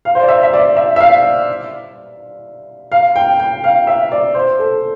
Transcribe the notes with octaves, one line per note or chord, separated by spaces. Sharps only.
F5
C5
D5
E5
E5
D5
E5
E5
F5
F5
G5
G5
F5
E5
D5
C5
A4